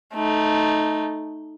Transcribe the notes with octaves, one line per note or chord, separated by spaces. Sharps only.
A3 D#4